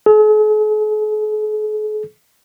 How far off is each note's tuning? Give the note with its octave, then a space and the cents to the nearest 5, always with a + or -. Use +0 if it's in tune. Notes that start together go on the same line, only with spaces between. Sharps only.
G#4 +45